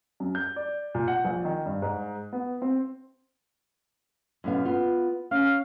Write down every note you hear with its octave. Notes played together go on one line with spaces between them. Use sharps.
F#2
G6
D5
A#2
F#5
A#1
D#3
G2
G#2
B3
C4
F#2 B2 F5
B3 F4
C#4 F5